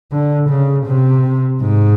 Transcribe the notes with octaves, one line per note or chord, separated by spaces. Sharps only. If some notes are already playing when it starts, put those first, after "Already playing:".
D3
C#3
C3
G#2